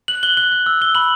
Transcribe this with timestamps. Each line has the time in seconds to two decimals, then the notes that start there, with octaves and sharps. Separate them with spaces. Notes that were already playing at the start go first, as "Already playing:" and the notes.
0.08 F#6 F#7
0.23 F#6 G7
0.37 F#6 G7
0.52 F#6
0.66 E6
0.81 E6 G7
0.95 B5 F#7